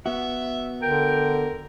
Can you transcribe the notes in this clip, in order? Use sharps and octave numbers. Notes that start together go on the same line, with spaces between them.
B3 F#4 E5
D3 A#4 G5